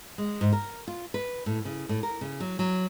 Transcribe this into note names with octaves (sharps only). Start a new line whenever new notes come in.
G#3
G#2
A#4
F4
B4
A2
C#3
A2
A#4
C#3
F#3
F#3